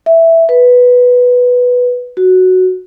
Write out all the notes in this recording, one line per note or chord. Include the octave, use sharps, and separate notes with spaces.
E5
B4
F#4